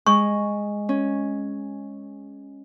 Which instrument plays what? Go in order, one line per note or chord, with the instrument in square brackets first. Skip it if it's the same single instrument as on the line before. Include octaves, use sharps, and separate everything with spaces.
[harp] G#3 [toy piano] C#6
[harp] C#4